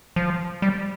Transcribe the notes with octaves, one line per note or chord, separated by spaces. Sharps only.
F3
G3